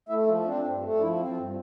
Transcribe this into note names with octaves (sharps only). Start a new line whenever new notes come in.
A3 E4 E5
F3 F4
C4 D4
G2
A3
D4
F3 E4
C4
F3 F4
G2